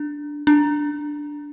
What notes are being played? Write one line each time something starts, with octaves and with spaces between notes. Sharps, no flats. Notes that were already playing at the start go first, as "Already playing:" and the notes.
Already playing: D4
D4